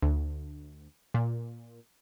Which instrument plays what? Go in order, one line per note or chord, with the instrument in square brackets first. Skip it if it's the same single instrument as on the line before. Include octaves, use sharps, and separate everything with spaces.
[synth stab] D2
A#2